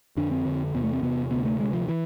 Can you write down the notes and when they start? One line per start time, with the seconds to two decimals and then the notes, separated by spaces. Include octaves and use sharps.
0.17 F2 D3 D4
0.31 C4
0.45 F2 D3
0.74 E2 C3 B3
0.83 A3
0.93 C4
1.02 E2 C3 B3
1.31 D2 C3 B3
1.45 A3
1.59 D2 C3 G#3
1.73 F3
1.88 E3